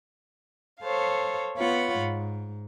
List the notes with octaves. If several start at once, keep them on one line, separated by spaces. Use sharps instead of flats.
A4 C5 C#5 F5
B3 F4 C#5 F#5 B5
G#2